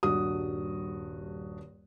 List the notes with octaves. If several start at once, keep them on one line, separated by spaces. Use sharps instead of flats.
D#1 G2 F#4 D#6